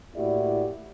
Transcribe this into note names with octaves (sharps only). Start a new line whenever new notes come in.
A2 A#3 E4 F#4 G4 D5